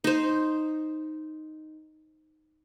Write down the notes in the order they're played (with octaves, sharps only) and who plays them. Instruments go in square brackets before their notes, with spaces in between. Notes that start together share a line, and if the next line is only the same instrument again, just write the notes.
[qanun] D#4 C5